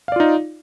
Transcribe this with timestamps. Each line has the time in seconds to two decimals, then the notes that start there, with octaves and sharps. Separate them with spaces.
0.08 F5
0.12 D5
0.16 F4
0.20 D#4